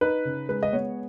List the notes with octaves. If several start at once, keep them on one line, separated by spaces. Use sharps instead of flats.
D#4 B4
C#3
G#3 B4
D#5
B3 C#5